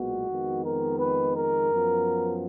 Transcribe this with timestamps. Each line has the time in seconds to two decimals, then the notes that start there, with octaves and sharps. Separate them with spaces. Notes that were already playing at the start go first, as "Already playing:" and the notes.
Already playing: B1 A#2 G#3 B3 F#4
0.29 F2 D#3 G#3 B3
0.65 A#4
1.00 B4
1.35 A#4
1.71 F#2 F3 B3